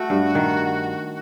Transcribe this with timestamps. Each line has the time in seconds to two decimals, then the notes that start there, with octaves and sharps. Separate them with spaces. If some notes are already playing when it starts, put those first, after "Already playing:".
Already playing: A3 F#4
0.10 G2
0.35 D#3